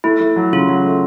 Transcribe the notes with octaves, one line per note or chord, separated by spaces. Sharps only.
A3 E4
A3
F#3
C#3 F4
F#3
A3